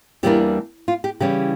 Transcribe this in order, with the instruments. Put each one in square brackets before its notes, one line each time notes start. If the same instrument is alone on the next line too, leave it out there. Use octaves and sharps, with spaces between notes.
[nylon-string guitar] E2 E3 G3 A#3 D4 G4
F4
G4
C#3 E3 G3 C#4 G4